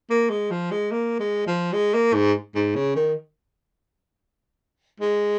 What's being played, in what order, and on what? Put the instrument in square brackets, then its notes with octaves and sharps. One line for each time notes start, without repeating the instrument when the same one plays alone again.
[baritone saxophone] A#3
G#3
F3
G#3
A#3
G#3
F3
G#3
A#3
G#2
G#2
C#3
D#3
G#3